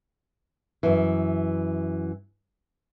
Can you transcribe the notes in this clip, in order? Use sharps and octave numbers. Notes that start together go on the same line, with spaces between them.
F#2 E3